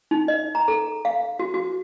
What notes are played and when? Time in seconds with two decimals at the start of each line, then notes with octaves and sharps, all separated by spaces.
0.11 D#4
0.28 D#5
0.55 A#5
0.68 A4
1.05 F5
1.39 F#4
1.54 F#4